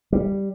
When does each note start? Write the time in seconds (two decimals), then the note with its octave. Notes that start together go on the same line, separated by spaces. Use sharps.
0.13 G3